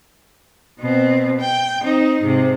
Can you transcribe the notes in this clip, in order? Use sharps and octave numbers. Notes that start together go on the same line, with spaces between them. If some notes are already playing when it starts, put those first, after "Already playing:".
B2 C4
G5
C4 D#4
G#2 C3